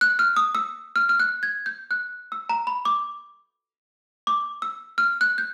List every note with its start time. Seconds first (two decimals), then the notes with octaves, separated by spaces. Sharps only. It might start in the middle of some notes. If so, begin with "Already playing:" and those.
0.01 F#6
0.19 F6
0.37 D#6
0.55 E6
0.96 F6
1.09 F6
1.20 F#6
1.43 G#6
1.66 G6
1.91 F#6
2.32 E6
2.49 A#5
2.67 B5
2.85 D6
4.27 D6
4.62 E6
4.98 F6
5.21 F#6
5.38 G6